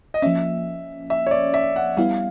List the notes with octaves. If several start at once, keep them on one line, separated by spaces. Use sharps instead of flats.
D#5
F3 A#3 C#4 E5
E5
C#5
D5
E5
F#5
G3 B3 E4 F5